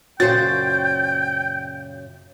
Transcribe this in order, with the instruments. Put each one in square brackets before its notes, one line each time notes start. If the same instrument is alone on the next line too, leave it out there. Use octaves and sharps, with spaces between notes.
[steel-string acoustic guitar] F#2 A#2 C#3 [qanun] F#4 C5 [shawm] G5 [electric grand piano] A6